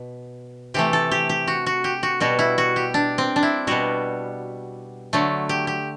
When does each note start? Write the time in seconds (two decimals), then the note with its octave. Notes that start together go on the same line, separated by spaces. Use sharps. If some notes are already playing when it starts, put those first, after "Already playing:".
Already playing: B2
0.74 C3 E3 A3 G4
0.93 A4
1.11 G4
1.29 G4
1.47 F#4
1.66 F#4
1.84 G4
2.03 F#4
2.20 B2 G3 F#4
2.39 E4
2.58 F#4
2.76 G4
2.94 D4
3.18 C4
3.36 D4
3.43 E4
3.67 B2 G3 F#4
5.13 D3 F#3 A3
5.49 G4
5.67 G4